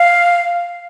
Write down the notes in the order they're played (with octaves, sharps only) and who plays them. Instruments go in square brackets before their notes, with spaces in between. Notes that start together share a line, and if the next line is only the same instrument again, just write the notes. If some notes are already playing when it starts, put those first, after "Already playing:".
Already playing: [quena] F5